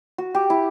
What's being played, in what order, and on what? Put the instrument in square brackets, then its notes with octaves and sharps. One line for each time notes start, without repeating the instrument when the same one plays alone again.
[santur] F#4
G4
E4